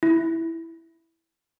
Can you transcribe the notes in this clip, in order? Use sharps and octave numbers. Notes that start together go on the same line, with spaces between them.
E4